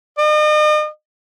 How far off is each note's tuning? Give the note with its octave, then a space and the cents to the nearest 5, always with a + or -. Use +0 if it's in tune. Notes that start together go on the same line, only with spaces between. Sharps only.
D#5 -40